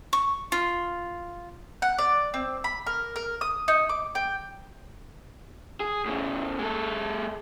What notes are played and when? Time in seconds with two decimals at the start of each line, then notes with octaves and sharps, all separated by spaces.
0.13 C#6
0.52 F4
1.82 F#5
1.98 D5
2.34 C4
2.64 B5
2.87 A#4
3.16 A#4
3.41 D#6
3.68 D#4
3.89 D6
4.15 G5
5.80 G#4
6.05 A2 C#3
6.59 G#3 A4